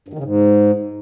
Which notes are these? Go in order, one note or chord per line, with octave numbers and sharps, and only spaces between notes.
G2
D#3
C#3
G#2